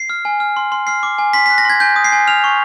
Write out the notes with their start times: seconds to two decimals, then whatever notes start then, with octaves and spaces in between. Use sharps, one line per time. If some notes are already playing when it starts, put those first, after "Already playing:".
Already playing: C7
0.10 F6
0.25 G#5
0.40 F6
0.57 C6
0.72 C6
0.87 F6 C7
1.03 D6
1.18 G#5
1.33 C6 B6
1.46 F#6 B6
1.58 A#6
1.65 C6 G#6
1.80 G#5 G6
1.96 D#6
2.05 C7
2.12 G#5
2.27 F6 F7
2.44 C#6